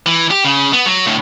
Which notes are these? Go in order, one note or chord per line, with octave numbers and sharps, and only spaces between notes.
E3
G4
C#3
B3
F#3
A2 D3